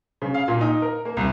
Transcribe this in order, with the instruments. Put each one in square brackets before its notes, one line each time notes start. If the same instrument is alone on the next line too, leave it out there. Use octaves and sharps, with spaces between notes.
[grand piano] C#3
F5
A#2
D#4
A#4
A#3
C2